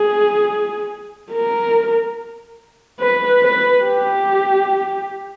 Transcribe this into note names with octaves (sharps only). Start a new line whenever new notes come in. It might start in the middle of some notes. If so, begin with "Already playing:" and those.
Already playing: G#4
A#4
B4
B4
G4